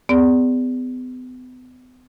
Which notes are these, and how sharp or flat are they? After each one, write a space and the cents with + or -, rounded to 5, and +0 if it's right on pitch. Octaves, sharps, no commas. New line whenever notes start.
B3 +40 G#4 -30 D5 -10